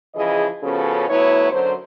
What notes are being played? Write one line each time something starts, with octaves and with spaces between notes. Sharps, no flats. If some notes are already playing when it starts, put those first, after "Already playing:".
C#3 E3 F3 G#4 D#5
C#3 F3 B3 C#4 F#4 A4
A2 F#3 B3 E4 C#5
F#2 D3 F#3 C5